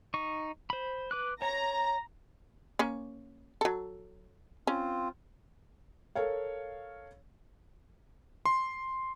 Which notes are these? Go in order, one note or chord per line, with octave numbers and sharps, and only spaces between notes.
D#4 C#6
C5 B5
B4 D6 F#6
C#5 A#5
A#3 C#4
F#3 A4
C4 C#4 F4
A4 A#4 C#5 F5
C6